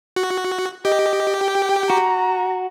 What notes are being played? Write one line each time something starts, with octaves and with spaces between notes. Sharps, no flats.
F#4
G4 D#5
G5
F#4 A#5